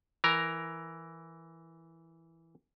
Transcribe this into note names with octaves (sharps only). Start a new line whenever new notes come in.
E3 A#4 A#5